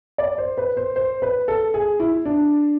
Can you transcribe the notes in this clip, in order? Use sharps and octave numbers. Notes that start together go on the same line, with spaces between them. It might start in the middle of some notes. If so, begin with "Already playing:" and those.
D5
C5
B4
C5
C5
B4
A4
G#4
E4
D4